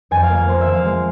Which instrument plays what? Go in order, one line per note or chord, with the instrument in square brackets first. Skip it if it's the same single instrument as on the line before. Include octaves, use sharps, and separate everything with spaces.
[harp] F2 G#5
F5
A#3
F5
A#3 C5
E5
F3
F5
G#3